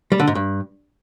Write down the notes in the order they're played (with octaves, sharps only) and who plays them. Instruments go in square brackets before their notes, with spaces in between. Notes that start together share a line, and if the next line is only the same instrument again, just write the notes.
[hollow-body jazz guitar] G3
D3
G#2
G2